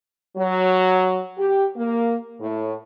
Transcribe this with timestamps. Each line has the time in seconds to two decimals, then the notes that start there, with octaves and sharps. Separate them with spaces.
0.37 F#3
1.38 G4
1.76 A#3
2.40 A2